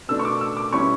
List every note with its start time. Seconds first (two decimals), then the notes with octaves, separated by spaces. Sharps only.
0.09 B2 A3 D4 E6
0.19 C#6
0.25 D6
0.41 E6
0.57 D6
0.73 B2 G3 C#4 E4 C#6